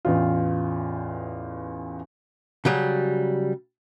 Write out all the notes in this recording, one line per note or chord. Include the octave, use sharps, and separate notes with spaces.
A1 E2 F4
C#3 F#3 G3